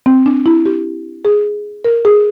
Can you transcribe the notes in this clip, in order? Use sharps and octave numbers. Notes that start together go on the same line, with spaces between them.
C4
D4
E4
G4
G#4
A#4
G#4